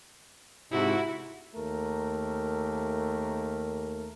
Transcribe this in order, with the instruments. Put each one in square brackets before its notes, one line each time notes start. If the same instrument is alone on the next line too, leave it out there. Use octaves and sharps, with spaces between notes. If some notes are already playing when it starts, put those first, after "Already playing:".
[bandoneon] G#2 C3 [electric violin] E4 F#4
[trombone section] D#2 A3 A#4